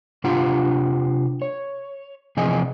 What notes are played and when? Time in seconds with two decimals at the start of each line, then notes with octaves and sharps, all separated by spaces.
0.24 C3 D4 F4 G4 F#5 A#5
1.42 C#5
2.37 C3 E3 F3 G#4 D#5 G#5